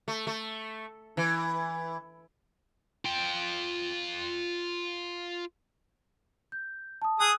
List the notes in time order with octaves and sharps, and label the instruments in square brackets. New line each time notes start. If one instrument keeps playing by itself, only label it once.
[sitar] A3
A3
E3
[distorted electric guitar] F4 G5
[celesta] G6
A5 D#6
[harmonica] G#4 D#6 [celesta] E6 F#6